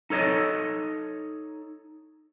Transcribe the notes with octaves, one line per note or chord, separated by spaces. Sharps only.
D#4 A4 C#5 D#5